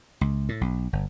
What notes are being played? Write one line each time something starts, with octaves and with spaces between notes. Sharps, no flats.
C#2
A2
B1
G1